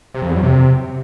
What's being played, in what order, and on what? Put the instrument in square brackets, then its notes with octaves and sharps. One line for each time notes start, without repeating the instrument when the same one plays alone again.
[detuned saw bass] C3
F2
E2
F#2
C3